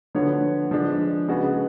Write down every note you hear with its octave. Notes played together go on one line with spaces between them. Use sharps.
D3 F3 B3 F#4 C#5
F3 G#3 D4
C#3 G#3 B3 F#4